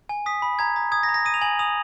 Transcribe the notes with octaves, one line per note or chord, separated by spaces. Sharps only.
G#5
D#6 B6
B5
A#5 G#6
A#5
D#6 G#6
A#6
A#5
A#6
D#6 D#7
F7
G#5 F#7
D#6 F7